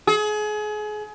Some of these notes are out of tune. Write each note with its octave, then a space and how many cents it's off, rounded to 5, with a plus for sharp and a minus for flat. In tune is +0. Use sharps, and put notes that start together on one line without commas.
G#4 +30